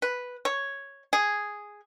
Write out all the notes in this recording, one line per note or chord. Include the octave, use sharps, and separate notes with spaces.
B4
C#5
G#4